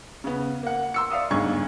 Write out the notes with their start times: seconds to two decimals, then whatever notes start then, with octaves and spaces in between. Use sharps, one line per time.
0.24 C#3 B3
0.63 A#3 F#5
0.94 C6 E6 C#7
1.11 D5 E5 F5 D#6 E6
1.31 G1 D2 G#2 D3 C#6 G#6